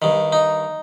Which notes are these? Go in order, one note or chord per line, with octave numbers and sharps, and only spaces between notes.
G2 D#3
D#4